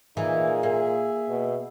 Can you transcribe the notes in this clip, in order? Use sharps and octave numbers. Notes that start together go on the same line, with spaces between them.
A#2 E3 D#4 G#4
A#3 E5
B2